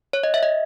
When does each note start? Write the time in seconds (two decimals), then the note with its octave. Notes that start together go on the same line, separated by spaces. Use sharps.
0.13 C#5
0.23 D#5
0.34 E5
0.43 D#5